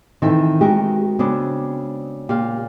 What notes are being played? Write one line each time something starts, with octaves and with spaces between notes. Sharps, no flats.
D#3 E3 C4 A4 E5
G#3 F#4 G4 A#4
C#3 B3 C4 D4
A#2 G4 F5